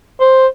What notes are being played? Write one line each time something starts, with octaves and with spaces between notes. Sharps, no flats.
C5